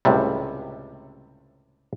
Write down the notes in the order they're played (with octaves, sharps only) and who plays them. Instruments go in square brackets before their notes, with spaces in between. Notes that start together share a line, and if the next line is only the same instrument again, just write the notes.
[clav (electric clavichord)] C#2 A2 C3 G3